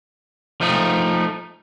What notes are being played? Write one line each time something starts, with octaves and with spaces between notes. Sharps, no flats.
F3 A3 D#4